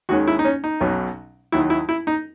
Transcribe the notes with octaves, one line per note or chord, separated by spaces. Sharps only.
D#2 D#3 G#3 C#4 F#4
E4
D#4
C#4
D#4
B1 B2 F#3 C#4
D#2 D#3 F#3 E4
E4
E4
D#4